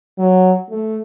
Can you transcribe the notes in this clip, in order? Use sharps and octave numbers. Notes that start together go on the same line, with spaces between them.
F#3
A3